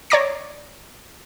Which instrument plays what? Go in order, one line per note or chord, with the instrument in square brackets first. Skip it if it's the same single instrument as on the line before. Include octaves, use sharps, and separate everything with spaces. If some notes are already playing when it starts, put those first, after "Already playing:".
[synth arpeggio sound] C#5 D5 A#5 D6 A#6 C7